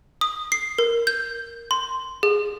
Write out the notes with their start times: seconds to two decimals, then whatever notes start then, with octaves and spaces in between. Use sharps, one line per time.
0.21 D#6
0.52 C7
0.78 A#4
1.07 G6
1.71 C6
2.23 G#4